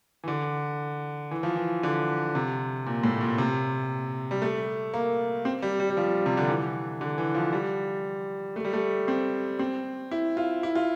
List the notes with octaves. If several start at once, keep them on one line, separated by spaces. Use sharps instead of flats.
E3
D3
E3
F3
E3
D3
C3
A#2
A2
A#2
C3
G3
A3
A#3
C4
G3
G3
G3
F3
C3
D3
E3
D3
E3
F3
G3
A3
G3
A3
C4
C4
E4
F4
E4
F4